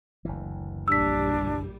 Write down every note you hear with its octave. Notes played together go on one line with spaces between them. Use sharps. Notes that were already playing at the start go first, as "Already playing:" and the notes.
F#1 D2 E3
A#1 G3 D4 E6 B6